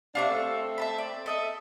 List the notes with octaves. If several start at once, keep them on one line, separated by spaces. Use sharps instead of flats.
C3 D4 F4 E5 C#6
A3 C4 A4
E5 A5 B5
D5
A4 D#5 E5